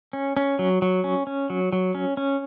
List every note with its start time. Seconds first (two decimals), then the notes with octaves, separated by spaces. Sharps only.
0.13 C#4
0.37 C#4
0.59 F#3
0.82 F#3
1.04 C#4
1.27 C#4
1.50 F#3
1.73 F#3
1.95 C#4
2.17 C#4